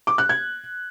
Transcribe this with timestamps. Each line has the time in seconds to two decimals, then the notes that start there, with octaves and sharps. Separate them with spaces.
0.07 D6
0.18 F#6
0.29 G#6